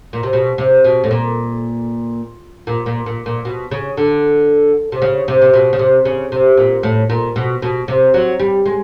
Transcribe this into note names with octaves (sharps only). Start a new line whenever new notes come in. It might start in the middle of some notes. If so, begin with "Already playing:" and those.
A#2
C3
B2
C3
B2
A2
A#2
A#2
A#2
A#2
A#2
B2
C#3
D3
C3
C#3
C3
C3
B2
C#3
C3
C#3
C3
A#2
A2
A#2
B2
B2
C3
F#3
G3
G#3